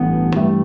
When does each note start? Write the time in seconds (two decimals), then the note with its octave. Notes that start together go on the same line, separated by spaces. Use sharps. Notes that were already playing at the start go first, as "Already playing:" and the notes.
Already playing: A1 G2 E3 B3
0.36 G2 E3 G3 A3